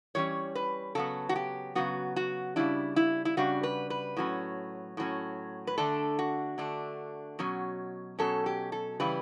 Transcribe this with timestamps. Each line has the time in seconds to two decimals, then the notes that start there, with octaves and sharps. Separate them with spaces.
0.15 E3 G3 C#4 C#5
0.55 B4
0.95 C#3 F#3 B3 A4
1.29 F#4
1.36 G4
1.75 C#3 F#3 B3 F#4
2.16 F#4
2.56 C#3 G3 D4 E4
2.96 E4
3.25 E4
3.37 C#3 G3 D4 F#4
3.63 B4
3.90 B4
4.17 A2 F#3 C#4
4.97 A2 F#3 C#4
5.67 B4
5.78 D3 A3 D4 A4
6.19 F#4
6.58 D3 A3 D4
7.39 B2 F#3 C#4
8.19 B2 F#3 C#4 A4
8.46 G4
8.72 A4
9.00 C#3 E3 G3 B4